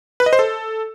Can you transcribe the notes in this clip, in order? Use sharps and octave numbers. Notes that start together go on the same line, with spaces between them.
B4
D#5
C5
A4